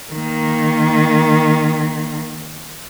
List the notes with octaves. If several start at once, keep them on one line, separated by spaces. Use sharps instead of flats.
D#3 A#3